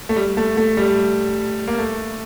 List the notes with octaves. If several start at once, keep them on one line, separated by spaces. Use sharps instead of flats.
A3
G3
A3
A3
G3
A#3
A3